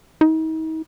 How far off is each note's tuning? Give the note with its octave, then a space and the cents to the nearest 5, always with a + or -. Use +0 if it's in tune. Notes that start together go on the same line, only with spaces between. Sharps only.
D#4 +40